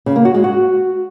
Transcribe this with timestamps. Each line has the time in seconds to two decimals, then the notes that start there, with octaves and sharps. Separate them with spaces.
0.06 C#3
0.16 A#3
0.25 F#4
0.34 G#3
0.44 F#4